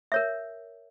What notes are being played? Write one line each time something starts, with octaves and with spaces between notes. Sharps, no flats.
A#4 C#5 E5